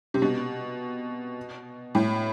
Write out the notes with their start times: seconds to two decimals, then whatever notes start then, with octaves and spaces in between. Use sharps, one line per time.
0.14 C3
0.22 B2
1.95 A2